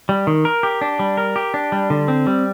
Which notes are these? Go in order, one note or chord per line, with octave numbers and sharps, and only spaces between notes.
G3
D#3
A#4
G4
D4
G3
A#4
G4
D4
G3
D3
C4
G3